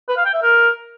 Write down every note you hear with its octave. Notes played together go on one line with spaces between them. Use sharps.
B4
F5
G5
E5
A#4